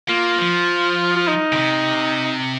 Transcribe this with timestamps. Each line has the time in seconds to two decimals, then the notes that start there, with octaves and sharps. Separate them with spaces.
0.09 A#3 F4
0.38 F3
1.16 F4
1.28 D#4
1.52 C#3
1.56 C3